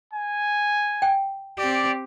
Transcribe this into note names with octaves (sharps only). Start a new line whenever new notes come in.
G#5
G5
C4 G4 D5